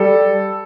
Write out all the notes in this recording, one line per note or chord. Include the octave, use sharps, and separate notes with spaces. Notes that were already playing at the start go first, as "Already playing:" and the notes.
Already playing: G3 A4